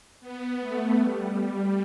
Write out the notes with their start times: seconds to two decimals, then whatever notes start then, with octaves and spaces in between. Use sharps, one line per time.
0.21 B3
0.60 A3
0.98 G3
1.38 G3